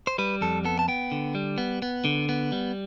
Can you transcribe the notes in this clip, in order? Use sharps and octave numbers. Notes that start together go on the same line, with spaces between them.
C5
G3 B4
F2 A4
B3 A4
A5
B3 G5
D3
G3
B3
B3
D3
B3
G3